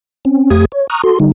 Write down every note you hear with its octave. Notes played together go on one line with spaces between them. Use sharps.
C4 C#4
F2 A3 G4 D#6 G#6
C#5
A#5 C#6 D#6 F6 F#6
F#4 A4 C6
D3 G3 D#4